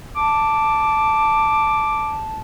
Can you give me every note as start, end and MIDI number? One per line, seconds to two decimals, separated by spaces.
0.16 2.38 81
0.16 2.17 86